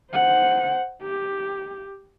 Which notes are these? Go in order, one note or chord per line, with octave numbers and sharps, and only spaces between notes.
C5 F#5
G4